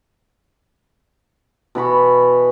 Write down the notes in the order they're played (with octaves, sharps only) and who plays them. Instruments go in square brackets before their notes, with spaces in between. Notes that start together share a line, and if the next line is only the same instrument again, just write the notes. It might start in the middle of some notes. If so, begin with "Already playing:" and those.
[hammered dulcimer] B2 E3 B5 C#6